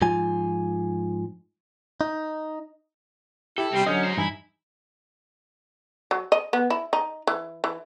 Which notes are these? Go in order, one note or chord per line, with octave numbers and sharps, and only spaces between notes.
G#2 F3 F4 G#5
D#4
E4 G4 A4
C3 G3 C4 C5
D3 F#3 C#4 D#5 G6
D#4 C5
G2 E3 D#4 E4 G#5
F#3
D#5
B3
E4
D#4
E3
E3